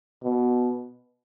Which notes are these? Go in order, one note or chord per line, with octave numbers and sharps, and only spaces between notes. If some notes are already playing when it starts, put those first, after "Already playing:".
B2